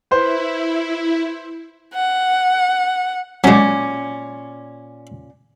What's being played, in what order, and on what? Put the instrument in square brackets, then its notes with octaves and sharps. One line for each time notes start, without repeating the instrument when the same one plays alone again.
[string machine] E4 [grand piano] B4 C5
[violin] F#5
[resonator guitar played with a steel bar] A#2 C#4 [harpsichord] F#3 G#3